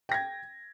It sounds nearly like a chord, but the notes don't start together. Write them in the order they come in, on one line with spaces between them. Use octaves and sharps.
G5 A#6 G#6